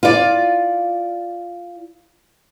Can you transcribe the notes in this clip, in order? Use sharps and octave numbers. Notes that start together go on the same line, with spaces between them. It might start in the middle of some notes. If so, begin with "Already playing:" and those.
F4 D5